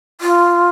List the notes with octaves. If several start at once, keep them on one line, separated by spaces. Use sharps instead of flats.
F4